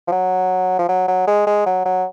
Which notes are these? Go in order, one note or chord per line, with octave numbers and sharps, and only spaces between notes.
F3
F#3
F3
F#3
F#3
G#3
G#3
F#3
F#3